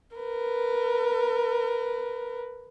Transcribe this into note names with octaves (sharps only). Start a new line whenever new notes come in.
A#4 B4